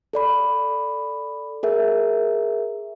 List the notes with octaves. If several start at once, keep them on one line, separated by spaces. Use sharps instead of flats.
A4 D5 B5
G#4 A#4 E5